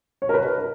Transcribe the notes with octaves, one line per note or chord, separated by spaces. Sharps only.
C#5
A#4
B4
A#4
A#4